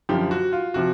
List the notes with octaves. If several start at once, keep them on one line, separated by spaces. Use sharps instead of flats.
F#2 D3 F3 G4
F#4
F4
C3 F3 F#4